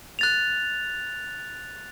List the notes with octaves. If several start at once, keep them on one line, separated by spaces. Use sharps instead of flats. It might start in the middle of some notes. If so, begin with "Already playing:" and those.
F#6 A6 F7